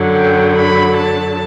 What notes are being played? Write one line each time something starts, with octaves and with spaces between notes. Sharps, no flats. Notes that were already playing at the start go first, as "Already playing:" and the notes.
Already playing: F#2 D3 F#3
G5
B5
A5